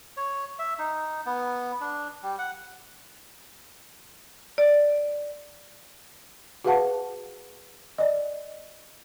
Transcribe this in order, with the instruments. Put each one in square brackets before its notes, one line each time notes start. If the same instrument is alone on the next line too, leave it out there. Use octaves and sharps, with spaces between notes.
[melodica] C#5
E5
D#4
B3
D4
G3
F#5
[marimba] D5
[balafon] F#4 G#4 B4 F5 F#5 A5
D5 D#5